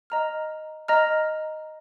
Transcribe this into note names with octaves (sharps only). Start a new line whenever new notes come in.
D#5 A#5 F6
D#5 A#5 F6